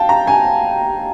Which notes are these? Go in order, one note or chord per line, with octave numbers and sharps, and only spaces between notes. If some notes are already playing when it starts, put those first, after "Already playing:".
Already playing: F5 G5 A5
A#5
G#5